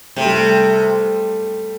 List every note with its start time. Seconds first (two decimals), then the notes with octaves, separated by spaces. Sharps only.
0.16 C3 A3
0.25 G3
0.34 A3